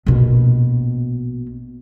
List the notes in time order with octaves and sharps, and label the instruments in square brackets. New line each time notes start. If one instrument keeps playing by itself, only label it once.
[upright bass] A#1 B2